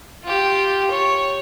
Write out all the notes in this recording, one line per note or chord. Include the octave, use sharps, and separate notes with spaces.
F4 G4
C#5